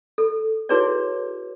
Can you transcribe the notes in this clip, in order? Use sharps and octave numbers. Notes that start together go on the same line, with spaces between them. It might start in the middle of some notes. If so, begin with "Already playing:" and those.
A4
E4 F#4 G#4 B4 C#5 D5